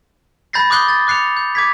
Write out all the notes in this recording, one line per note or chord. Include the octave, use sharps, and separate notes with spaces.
B5 G6 A6 A#6 C7
D6 D#6 F#6 G6 C7 G7
A6
D6 F#6 C7 C#7 F7
G6
D6 G#6 B6